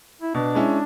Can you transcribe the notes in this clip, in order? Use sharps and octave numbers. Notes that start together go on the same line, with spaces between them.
E4
B2 D4
G#3 C#4 E4